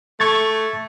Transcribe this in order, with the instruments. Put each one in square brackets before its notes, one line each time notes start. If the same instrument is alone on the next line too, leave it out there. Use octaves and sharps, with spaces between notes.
[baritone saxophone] A3 [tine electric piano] C#6 G#6 A6